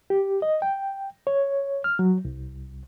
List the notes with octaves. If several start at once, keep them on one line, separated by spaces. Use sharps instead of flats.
G4
D#5
G5
C#5
F6
F#3
C2